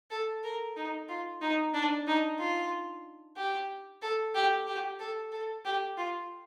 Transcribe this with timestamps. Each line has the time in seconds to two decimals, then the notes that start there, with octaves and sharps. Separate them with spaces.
0.11 A4
0.44 A#4
0.77 D#4
1.09 F4
1.42 D#4
1.74 D4
2.07 D#4
2.39 F4
3.37 G4
4.02 A4
4.35 G4
4.67 G4
5.00 A4
5.32 A4
5.65 G4
5.97 F4